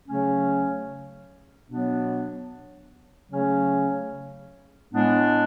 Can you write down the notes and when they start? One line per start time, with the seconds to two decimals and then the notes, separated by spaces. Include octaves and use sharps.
0.09 C#3 F#3 A3 C#4
1.70 B2 F#3 B3 D4
3.30 C#3 F#3 A3 C#4
4.92 A2 G#3 B3 D4